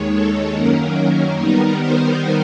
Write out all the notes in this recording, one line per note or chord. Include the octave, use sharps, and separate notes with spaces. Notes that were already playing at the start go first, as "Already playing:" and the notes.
Already playing: D#2 D#3 G#3 C#5
A4
F#2 D#3 F#3 A#3 C#4 A#4
D#3 G3 B3 D#4 A#4
C5